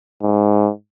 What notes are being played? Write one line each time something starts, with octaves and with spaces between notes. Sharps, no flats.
G#2